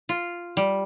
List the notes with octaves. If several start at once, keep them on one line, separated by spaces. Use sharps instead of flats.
F4
G3